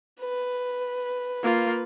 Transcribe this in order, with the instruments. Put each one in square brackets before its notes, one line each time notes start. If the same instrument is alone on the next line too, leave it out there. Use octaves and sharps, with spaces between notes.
[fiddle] B4
[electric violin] A#3 F4